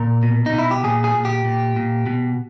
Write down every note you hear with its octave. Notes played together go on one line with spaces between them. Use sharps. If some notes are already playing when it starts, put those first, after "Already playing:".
Already playing: A#2 A#4
B2
D#4
B2
E4
G4
A#2 G#4
G#4
A#2
G4
A#2
A#2
B2